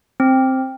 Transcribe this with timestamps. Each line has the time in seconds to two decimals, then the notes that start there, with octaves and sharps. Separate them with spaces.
0.20 C4